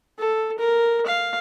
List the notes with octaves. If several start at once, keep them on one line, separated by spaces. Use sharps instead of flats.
A4
A#4
F5